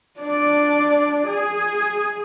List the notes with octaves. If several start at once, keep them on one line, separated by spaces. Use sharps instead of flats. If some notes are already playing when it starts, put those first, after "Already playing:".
D4 D5
G#4